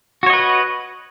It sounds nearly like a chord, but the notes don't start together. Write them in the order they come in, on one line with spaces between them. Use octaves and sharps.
F#4 C#5 D#5 B4